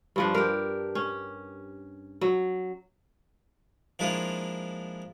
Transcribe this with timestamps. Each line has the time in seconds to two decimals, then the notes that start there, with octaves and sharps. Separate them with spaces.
0.16 G2 F3 D4
0.34 G4 A#4
0.95 C#4
2.21 F#3
3.99 F3 G#3 A#3 D4 E4 F4